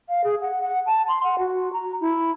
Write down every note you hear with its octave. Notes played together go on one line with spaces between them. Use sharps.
F5
G#4
F#5
F#5
A5
C6
F#5
F#4
A#5
E4